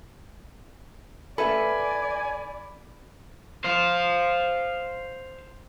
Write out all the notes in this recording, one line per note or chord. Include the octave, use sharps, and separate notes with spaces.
A4 B4 D5 E5 G#5 B5
C5 F5